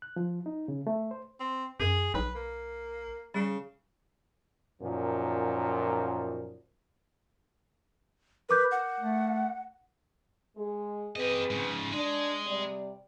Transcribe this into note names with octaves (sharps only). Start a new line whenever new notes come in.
F#6
F3
D#4
C#3
A3
C5
C4
F#2 G#4
B1 B4
A#3
C#3 G3
F#2 A#2 D#3 F3
A#4 B4 D6 G6
F#5
A3
G#3 G#4
C4 G4 G#4 B4 D#5
G#2 C#3
G#3 D4
C3 G3 D5